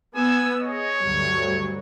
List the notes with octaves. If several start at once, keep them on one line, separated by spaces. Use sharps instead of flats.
B3 G#5 E6
G#4 C#5 D#5
D2 G2 F#3